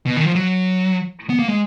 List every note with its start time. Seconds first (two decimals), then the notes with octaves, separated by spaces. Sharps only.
0.06 B2
0.16 D#3
0.25 F3
0.35 F#3
1.30 B3
1.39 A#3
1.49 G#3